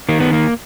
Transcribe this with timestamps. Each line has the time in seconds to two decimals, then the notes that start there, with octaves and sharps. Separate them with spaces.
0.09 D#3 A#3
0.20 B3
0.33 A#3